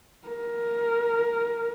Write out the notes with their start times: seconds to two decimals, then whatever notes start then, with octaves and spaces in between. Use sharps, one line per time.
0.28 A#4